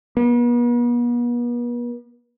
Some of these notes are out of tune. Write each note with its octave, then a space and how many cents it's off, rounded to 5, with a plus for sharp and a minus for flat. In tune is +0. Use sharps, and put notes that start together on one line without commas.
B3 -40